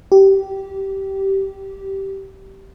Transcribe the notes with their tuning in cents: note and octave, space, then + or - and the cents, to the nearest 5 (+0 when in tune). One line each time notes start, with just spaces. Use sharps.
G4 -15